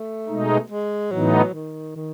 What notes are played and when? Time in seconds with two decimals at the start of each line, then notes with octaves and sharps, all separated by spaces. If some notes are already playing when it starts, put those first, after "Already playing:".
Already playing: A3
0.28 B2 G#3 D#4
0.70 G#3
1.11 A2 E3 F#3 B3 D#4
1.54 D#3
1.96 D#3